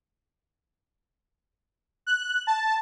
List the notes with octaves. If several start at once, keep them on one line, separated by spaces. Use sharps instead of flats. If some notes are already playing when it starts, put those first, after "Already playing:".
F#6
A5